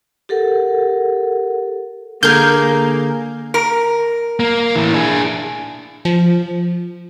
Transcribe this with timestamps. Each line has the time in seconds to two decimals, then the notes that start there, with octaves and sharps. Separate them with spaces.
0.29 G4 A4 A#4 F#5
2.23 D3 A#3 G#4 A#4 G6
3.54 A#4
4.40 A#3
4.76 A2 E3
4.94 D4 G#4
6.05 F3